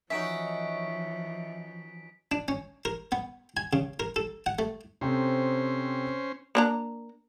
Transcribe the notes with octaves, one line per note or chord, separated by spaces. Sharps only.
E3 F3 C#4 D#4 F#4 E5 B6 D7
D4
C#4
A#4
B3
G#5
C#3
A#4
A4
F#5
A3
C3 C4 C#4 A4 C5
A#3 D4 A#5